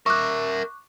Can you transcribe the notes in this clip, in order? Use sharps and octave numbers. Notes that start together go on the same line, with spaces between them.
A#4 E5 C#6 D6 F#6